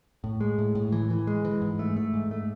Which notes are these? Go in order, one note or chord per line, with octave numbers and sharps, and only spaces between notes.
A2
G#3
A2
A2
E3
E3
G#3
E3
G#2
A3
A3
G#2
A3